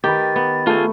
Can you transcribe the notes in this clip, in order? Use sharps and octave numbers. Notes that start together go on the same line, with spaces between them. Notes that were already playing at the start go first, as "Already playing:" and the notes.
D#3 G4 B4 A6
B3
A3 F4 G#4